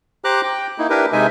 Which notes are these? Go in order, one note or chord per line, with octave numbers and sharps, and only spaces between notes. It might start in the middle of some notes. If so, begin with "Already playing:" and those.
G4 C5 A#5 D6 F#6
G5
A#3 D#4 E4
D4 E4 G4 A#4 B4
C3 G#3 D#4 E5 G#5